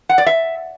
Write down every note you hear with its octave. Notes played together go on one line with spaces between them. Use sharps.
F#5
D5
E5